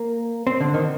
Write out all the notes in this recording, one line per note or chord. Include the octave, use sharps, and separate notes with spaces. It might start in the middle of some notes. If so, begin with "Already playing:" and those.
Already playing: A#3
C4
D3
D#3